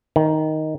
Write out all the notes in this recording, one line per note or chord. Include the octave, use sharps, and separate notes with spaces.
D#3